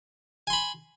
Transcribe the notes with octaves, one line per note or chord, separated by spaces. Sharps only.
G#5 B5 C6